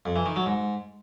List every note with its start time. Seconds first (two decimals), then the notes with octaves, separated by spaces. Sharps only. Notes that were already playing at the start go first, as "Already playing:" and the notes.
0.06 F2
0.16 E3
0.26 D#3
0.36 F#3
0.46 G#2